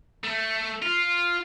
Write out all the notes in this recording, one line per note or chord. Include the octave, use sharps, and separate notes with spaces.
A3
F4